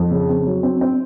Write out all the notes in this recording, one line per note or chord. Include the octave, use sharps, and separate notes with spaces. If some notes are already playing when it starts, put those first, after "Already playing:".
Already playing: F2
C#3
C4
F#3
C4
C4